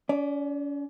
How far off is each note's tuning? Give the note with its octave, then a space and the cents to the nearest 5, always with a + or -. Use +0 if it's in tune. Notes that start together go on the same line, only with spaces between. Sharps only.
C#4 +40 D5 +0